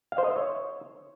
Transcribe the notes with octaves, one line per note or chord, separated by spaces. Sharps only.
F5
C5
D#5
E5
C#5